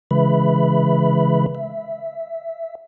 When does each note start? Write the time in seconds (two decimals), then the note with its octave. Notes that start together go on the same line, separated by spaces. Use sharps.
0.11 C#3 E3 G#3 B4 E5 B5
1.55 E5